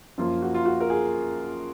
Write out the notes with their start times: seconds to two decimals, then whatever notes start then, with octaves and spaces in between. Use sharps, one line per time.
0.18 F#2 F3 A#3 F4
0.42 F#4
0.54 F4
0.65 F#4
0.80 A#4
0.90 G#4